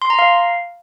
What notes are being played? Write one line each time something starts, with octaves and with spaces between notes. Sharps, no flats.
C6
A#5
F5